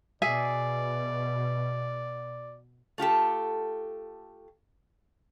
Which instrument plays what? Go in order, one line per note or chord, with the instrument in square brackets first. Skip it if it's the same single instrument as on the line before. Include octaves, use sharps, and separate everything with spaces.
[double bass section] B2 [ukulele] G#4 E5 G#5 [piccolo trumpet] D5
[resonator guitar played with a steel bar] A3 F4 G4 A4